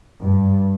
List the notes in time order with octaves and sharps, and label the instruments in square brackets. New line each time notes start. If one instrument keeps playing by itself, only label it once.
[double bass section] G2